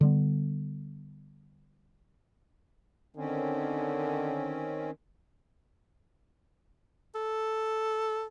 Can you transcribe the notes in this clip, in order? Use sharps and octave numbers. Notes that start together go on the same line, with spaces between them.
D3 G3 B3
D3 D#3 C4 C#4
A4